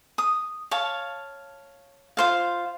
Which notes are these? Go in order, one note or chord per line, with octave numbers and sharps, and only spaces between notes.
D#6
C#5 F5 A5
F4 C5 F5